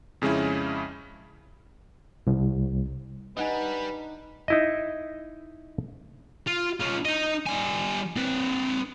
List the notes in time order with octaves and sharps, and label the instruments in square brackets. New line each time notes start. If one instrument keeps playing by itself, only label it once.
[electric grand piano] F2 C#3 G#3 C#4 E4
[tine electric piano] C2
[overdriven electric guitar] G3 [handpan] D4 D#4 [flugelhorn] B4 [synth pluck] D#5 F#5 G#5
[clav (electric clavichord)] D#4 E4 D#5
[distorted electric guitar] F4
C#4 F4
D#4 D#5
G3 G#5
C4 B4